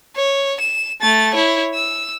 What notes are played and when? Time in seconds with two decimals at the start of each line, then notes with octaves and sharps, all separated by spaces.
0.16 C#5
0.60 E7
1.01 A3 A6
1.34 E4 C#5
1.75 E6